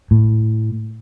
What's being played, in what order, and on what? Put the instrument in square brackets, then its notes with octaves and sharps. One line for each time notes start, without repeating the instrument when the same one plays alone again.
[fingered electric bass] A2